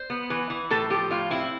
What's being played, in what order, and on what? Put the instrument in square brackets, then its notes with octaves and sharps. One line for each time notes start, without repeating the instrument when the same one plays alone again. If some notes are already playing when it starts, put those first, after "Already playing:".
Already playing: [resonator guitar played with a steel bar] C5
B3
E3 B4
E3
A2 A4
F3 G4
A2 F4
C4 E4